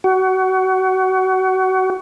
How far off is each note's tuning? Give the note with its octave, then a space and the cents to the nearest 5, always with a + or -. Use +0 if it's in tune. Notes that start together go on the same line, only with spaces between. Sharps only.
F#4 +25